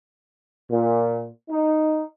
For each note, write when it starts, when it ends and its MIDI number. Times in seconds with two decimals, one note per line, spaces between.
0.71 1.27 46
1.49 2.02 63